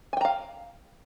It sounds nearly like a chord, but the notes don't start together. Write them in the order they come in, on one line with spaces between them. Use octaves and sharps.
G#5 G5 A#5 F5